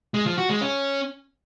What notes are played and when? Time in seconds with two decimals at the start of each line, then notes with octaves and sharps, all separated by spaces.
0.14 G#3
0.26 F3
0.38 F#4
0.49 G#3
0.61 C#4